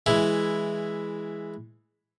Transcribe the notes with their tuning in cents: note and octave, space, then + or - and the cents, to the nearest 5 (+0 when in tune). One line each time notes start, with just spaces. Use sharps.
E3 +0 G#3 +0 E4 +5